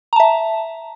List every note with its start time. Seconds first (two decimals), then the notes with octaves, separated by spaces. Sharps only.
0.13 A#5
0.16 A5
0.20 E5